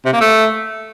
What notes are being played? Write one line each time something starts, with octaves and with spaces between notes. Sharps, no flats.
C3
A#3
A3